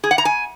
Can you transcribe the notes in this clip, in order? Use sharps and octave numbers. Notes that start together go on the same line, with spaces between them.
G#4
F#5
A#5
G#5